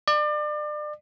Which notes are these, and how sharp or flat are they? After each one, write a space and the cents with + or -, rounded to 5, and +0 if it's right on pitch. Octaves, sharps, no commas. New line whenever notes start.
D5 +35